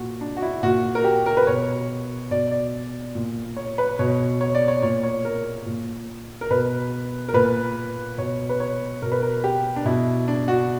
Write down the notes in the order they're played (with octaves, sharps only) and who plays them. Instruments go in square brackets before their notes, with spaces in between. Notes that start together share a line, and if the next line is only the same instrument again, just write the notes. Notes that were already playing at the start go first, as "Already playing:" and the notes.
Already playing: [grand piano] A#2 F#4
D4
F#4
E4
A#2 F#4
A#4
G4
A#4
B4
B2 C#5
B2 D5
D5
A#2
C#5
B4
B2 C#5
C#5
D5
C#5
A#2 C#5
C#5
A#4
A#2
A#4
B2 B4
A#4
A#2 B4
B2 C#5
B4
C#5
B2 A#4
B4
A#4
G4
D4
B2 E4
D4
F#4